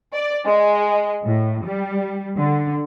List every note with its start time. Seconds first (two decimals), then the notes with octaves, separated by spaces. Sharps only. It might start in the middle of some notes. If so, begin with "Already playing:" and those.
0.13 D5
0.46 G#3
1.23 A2
1.65 G3
2.37 D3